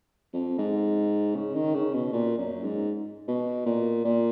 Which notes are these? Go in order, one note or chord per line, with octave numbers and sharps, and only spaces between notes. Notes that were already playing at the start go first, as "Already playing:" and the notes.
F2
G#2
C#3
D#3
C#3
B2
A#2
F#2
G#2
B2
A#2
A#2